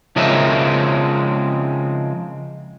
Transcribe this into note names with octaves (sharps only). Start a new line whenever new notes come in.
C#3 F3 G#3 C4 A#4 E5